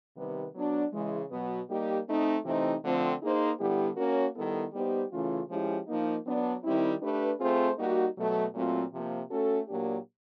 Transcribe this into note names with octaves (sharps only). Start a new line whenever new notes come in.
C3 D#3 G3 B3
F#3 B3 D4 F#4
C#3 E3 G#3
B2 F#3 B3
G3 A#3 D#4 G4
A3 C4 D#4
C3 E3 A3 C4 D#4
D3 F3 A3 C4
A#3 D#4 G#4 C5 D#5
D3 G3 B3 E4 G4
A#3 C#4 F#4 A#4 C#5
D#3 G3 B3 E4 A4
G3 B3 D#4 G4 C5
C#3 E3 A3 C#4 F4
F3 G#3 C#4 E4 G4
F3 A#3 D#4
F#3 B3 D4
D#3 G3 C4 E4
A3 D4 G4 B4
A3 C4 F4 G#4 C5
G3 A#3 D#4 F#4
B2 F#3 A3
A#2 F#3 A3 C4 F4
C3 F3 A#3
A3 C#4 F#4 A4
A#2 F#3 A#3 D4 G4